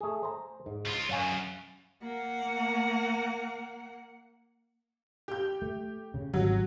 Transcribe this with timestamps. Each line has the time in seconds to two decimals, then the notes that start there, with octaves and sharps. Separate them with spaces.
0.01 A3 G#4
0.23 C5 A#5
0.66 G#2
0.85 C#2 F4
1.09 F#2 C#5 F5 G#5
2.02 A#3 F#5
5.28 G4 G6
5.62 A3
6.14 C#3
6.34 G#1 F#3